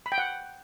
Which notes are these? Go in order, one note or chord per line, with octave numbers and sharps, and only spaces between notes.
B5
G5
F#5